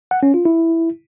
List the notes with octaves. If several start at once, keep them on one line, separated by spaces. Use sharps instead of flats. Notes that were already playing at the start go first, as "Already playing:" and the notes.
F#5
C#4
F4
E4